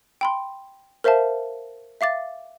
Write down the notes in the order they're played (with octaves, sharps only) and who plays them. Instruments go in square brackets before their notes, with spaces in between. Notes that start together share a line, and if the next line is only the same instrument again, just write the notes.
[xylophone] G5 B5 C6
A#4 C5 E5 F5 A5
E5 F5 D6 A6